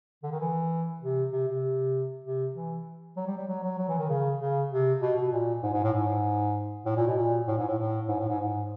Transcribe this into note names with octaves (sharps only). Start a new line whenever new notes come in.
D3
D#3
E3
C3
C3
C3
C3
E3
F#3
G3
G3
F#3
F#3
F#3
E3
D#3
C#3
C#3
C3
B2
B2
B2
A#2
G#2
G#2
A2
G#2
A2
A#2
B2
A#2
A2
G#2
A2
A2
G#2
A2
G#2
G#2